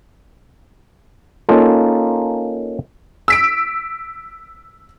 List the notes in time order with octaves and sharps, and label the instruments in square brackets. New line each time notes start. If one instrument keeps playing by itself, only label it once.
[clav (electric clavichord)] A#3 C#4 D#4 F4 A4
[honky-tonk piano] E6 B6 D7